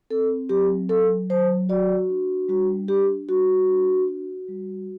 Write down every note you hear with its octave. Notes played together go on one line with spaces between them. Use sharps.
C4 A4
F#3 G4
F#3 A4
F#3 C5
F#4 D5
D4
G3 F#4
D4 G4
G3 F#4
D4
F#4
G3